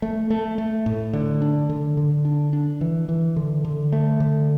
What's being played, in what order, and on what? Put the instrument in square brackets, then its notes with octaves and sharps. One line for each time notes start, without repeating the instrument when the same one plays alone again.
[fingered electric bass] A3
A3
A3
A2
D3
D4
D3
D3
D4
D4
E3
E3
D3
D3
A3
D3